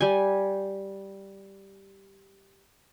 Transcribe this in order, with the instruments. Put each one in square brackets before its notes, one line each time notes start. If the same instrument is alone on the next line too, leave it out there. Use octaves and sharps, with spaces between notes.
[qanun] G3 G#5